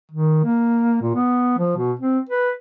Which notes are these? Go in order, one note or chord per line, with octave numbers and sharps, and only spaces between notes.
D#3
A#3
A#2
B3
F3
B2
C4
B4